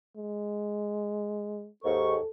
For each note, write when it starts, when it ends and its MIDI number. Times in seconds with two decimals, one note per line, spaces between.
0.17 1.69 56
1.84 2.16 39
1.84 2.16 44
1.84 2.31 69
1.84 2.16 85